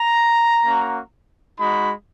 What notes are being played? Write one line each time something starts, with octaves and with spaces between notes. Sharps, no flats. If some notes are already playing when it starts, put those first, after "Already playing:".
Already playing: A#5
A#3 C#4 F#4
G#3 D#4 F#4 B5